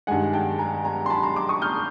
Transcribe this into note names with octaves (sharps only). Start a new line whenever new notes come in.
G2 D#3 G#3 F#5 G#5
G5 A5
G#5 A#5
G#5 A#5
C6
A5 B5
A#5 C6
C6 D6
C#6 D#6
F6 G6